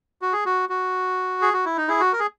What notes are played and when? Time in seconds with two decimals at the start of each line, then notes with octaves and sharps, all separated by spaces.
0.22 F#4
0.33 G#4
0.45 F#4
0.69 F#4
1.42 G#4
1.53 F#4
1.65 E4
1.77 D#4
1.88 E4 G#4
2.00 F#4
2.13 A#4
2.19 G#4